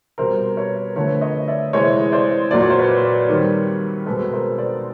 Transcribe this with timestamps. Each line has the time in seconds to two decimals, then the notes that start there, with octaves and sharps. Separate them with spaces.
0.18 B2 G3 C4 A#4 C5
0.57 B4 C#5
0.96 D3 F3 A3 C4 B4 C#5
1.21 C#5 D#5
1.48 D5 E5
1.73 C3 E3 G#3 C4 C#5 D#5
2.12 C5 D5
2.51 A#2 F#3 A#3 D5
2.60 C#5
2.70 C5
2.79 B4 C#5
3.29 D#3 G3 C4
4.06 B2 G#3 C4 A4 B4
4.33 A#4 C5
4.58 C5 D5